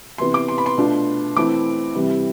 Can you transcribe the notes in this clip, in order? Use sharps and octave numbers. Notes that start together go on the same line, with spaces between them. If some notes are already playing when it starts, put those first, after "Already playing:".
C3 E3 B3 C6
D6
C6
B5
C6
B2 A3 D4 F4
E3 A3 C4 E4 D6
C3 E3 G3